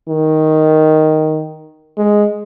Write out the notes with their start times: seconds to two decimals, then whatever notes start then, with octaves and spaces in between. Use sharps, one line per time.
0.09 D#3
1.97 G#3